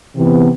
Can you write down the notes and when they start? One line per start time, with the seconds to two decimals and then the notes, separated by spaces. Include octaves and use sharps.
0.15 C3 E3 B3